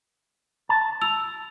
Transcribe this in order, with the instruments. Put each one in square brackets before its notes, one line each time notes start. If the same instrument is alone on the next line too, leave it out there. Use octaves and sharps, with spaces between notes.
[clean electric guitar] A5
[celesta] E6 F7